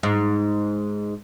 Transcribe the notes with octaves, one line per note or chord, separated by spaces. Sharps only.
G#2